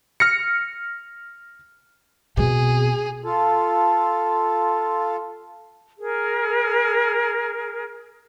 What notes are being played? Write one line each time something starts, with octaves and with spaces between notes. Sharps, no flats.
F6 A#6 C#7
B2 C4 G#4
F4 A4
G#4 A#4